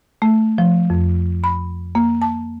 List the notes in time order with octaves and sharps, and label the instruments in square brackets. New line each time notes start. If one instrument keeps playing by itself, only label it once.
[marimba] A3
F3
F2
B5
A#3
A5